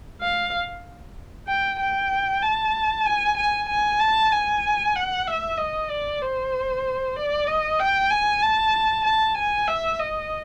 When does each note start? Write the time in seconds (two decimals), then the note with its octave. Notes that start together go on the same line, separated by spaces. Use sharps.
0.21 F5
1.48 G5
1.80 G5
2.43 A5
3.06 G#5
3.38 G#5
3.69 G#5
4.00 A5
4.32 G#5
4.96 F#5
5.27 E5
5.58 D#5
5.90 D5
6.22 C5
7.16 D5
7.47 D#5
7.80 G5
8.10 G#5
8.42 A5
9.05 A5
9.37 G#5
9.68 E5
9.99 D#5